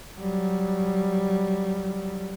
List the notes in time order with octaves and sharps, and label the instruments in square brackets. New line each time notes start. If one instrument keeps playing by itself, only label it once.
[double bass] F#3 G3